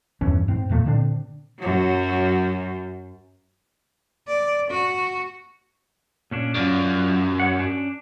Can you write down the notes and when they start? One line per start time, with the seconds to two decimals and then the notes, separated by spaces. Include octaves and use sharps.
0.21 E2 G2 E3 C#4
0.48 G#2 C4
0.69 E2 A#2 A3 A#3
0.85 A#2 D3 C4 D4
1.59 F#2 F#3
4.27 D5
4.70 F#4
6.31 A#2 C#4 D4
6.55 F#2 F#3 F4 D5
7.40 C#5 F#5
7.59 C#4 D4